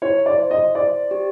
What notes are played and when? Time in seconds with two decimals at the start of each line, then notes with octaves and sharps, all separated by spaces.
0.02 E4 C#5
0.26 D5
0.39 C5
0.51 D#5
0.75 E4 D5
1.11 G4